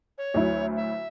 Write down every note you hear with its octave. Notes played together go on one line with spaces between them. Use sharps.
C#5
D2 F#3 E4
E5